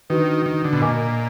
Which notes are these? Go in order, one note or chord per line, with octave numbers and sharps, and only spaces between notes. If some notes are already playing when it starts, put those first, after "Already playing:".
D#3 D4 F#4 B4
D#3
D3
B2
A#2 A#4 D#5 G#5 D6